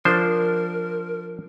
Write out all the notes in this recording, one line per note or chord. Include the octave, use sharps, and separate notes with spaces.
F3 D4 A#4 C5